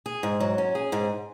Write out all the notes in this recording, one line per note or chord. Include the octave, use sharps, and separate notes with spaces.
G#4
G#2
F#3
C#4
G#4
G#2